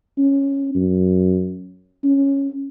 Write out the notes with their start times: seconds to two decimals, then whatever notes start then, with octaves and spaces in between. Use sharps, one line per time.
0.18 C#4
0.75 F#2
2.04 C#4